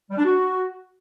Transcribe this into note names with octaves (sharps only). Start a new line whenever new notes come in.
G3
D4
F#4